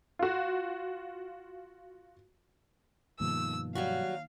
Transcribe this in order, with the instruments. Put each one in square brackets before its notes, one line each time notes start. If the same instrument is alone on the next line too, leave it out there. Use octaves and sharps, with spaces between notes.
[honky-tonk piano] F4 F#4
[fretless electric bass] G2 B2 F3 [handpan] D#3 A#3 [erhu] E6
[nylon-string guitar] F#3 G3 F#4 [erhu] F5